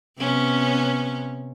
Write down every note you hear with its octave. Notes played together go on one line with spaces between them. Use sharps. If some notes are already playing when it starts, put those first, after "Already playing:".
C3 B3 C#4